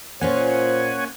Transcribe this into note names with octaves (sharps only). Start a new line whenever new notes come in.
A#2 A#3 C#4 F4 C5 C#5 F#5 G#5